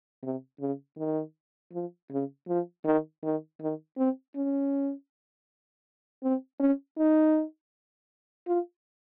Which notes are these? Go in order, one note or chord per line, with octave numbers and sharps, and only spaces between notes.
C3
C#3
D#3
F3
C#3
F3
D#3
D#3
D#3
C4
C#4
C4
C#4
D#4
F4